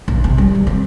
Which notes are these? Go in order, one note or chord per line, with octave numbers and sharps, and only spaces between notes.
A#1
C3
G3
D#3
C4